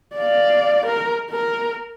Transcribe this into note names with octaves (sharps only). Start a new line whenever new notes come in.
D5 F5
A#4
A#4